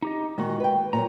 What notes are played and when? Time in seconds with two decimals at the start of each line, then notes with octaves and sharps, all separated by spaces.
0.02 D#4 G4 D#5
0.38 A#2 D#3 G#3 F#4
0.60 B4 G5
0.93 A#2 F#3 A#5